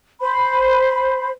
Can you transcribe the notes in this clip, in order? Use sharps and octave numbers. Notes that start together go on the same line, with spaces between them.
C5 B5